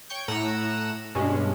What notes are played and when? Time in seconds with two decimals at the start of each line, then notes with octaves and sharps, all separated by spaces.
0.10 C#5 G5 C#6 G6
0.28 A2 F#5 A#5 E6 D#7
1.15 G2 B2 G#3 C#4